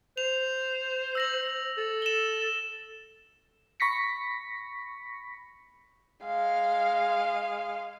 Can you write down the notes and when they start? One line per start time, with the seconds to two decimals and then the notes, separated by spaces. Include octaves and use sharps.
0.17 C5 F7
1.15 E6 A#6 F#7
1.77 A4
2.02 E7 G7
3.80 B5 C#6 A#6 B6 C#7
6.25 G#3 F5